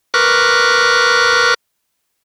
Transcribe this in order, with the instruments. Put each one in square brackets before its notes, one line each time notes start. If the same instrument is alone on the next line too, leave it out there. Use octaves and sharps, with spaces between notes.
[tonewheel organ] A#4 B4 C#6 D6 F6 F#6